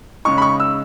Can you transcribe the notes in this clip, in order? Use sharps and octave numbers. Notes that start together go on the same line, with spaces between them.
C#3 G#3 D#4 C#6
B5
C#6
E6